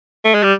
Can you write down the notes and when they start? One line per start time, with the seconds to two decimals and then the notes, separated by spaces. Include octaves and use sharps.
0.25 A3
0.34 G#3
0.43 G3